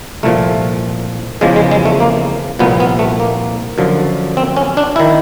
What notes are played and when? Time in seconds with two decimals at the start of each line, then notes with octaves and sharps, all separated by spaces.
0.23 C2 A#2 F3 A3
1.41 E2 C#3 F3 G#3
1.56 G#3
1.71 G#3
1.86 A3
2.00 A#3
2.59 C2 A#2 F3 B3
2.80 B3
2.99 A3
3.20 A#3
3.78 F#2 D3 F3
4.37 C4
4.57 C#4
4.77 D4
4.96 D#3 E4